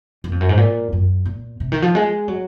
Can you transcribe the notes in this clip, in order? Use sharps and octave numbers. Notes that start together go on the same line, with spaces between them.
F#2
F2
F#2
G#2
A#2
F#2
A#2
C3
D#3
F3
G#3
F#3